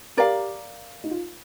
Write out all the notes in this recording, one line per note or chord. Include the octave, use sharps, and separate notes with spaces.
G4 A#4 D5 F5
D#4
F4